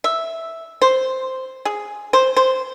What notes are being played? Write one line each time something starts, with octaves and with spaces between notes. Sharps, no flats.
E5
C5
G#4
C5
C5